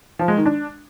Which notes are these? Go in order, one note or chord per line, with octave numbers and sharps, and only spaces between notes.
F3
G#3
D#3
D4